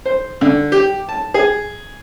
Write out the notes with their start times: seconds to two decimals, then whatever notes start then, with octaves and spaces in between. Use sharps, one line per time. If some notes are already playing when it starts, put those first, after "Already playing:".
0.05 C5
0.41 D3
0.72 G4
1.09 A5
1.34 G#4